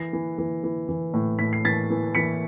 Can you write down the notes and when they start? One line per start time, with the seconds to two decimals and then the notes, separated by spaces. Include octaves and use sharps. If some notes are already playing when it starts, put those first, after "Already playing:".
Already playing: E3 A#6 C7
0.13 E3
0.38 E3
0.64 E3
0.89 E3
1.14 A2
1.39 A2 B6
1.53 C7
1.65 E3 A6 B6
1.90 E3
2.15 E3 B6 C#7